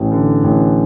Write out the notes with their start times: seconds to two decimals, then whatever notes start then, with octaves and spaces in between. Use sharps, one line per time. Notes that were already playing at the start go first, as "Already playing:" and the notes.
Already playing: A1
0.12 D3
0.44 A1